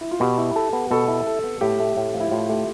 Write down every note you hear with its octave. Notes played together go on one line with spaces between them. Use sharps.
E4
F4
B2 G4
E4
A4
B3
B2 A4
E4
A4
B3
A2 G4
A3
A2
F3
E4
A2 F4
A3 G4